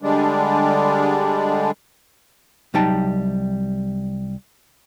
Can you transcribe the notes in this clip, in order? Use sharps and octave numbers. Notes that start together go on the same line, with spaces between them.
D3 G3 G#3 D4
C2 F#3 G3 D#4 G5 A5